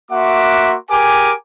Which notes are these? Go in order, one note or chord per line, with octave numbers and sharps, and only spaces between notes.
A#3 F#4 E5 F#5 C6 D6
G4 G#4 A#4 G#5 D6